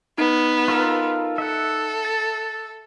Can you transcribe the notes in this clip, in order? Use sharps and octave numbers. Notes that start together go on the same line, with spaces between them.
B3 D#4
F4 A4 A#4
A4 E5 F#5
A6